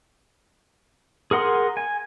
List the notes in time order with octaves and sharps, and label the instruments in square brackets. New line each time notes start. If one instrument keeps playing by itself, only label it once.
[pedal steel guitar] G#4 A#4 F#5 C6 D#6
G#5